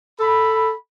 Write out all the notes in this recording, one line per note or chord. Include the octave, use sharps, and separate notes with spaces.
A4 B5